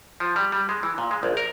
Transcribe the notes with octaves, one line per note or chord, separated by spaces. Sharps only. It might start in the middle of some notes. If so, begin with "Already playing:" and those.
F3
G3
G3
G#3
E3
A#2
G#3
A#1
A#4